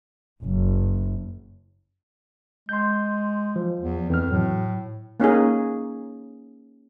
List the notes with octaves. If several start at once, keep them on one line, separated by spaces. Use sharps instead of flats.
F#1
G#3 C6 G6
F3
E2
F2 E3 F6
A2 F#3
A#3 C#4 D#4 G#4